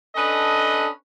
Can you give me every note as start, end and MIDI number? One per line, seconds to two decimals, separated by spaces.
0.16 0.88 61
0.16 0.88 62
0.16 0.88 69
0.16 0.88 71
0.16 0.88 75